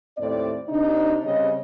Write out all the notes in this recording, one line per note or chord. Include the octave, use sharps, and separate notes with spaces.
D#2 A2 C4 D5
C3 D4 D#4
C#3 G3 C4 C#4 G4 D#5